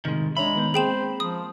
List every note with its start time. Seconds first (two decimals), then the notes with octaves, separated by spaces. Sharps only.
0.05 A2 C3 D#3 G#3
0.37 G#3 D4 C#5 E5 A#5 B5
0.55 D#3 B3 G6
0.74 G#3 A#3 C4 G#4 C5 G5 E7
1.20 F3 D#6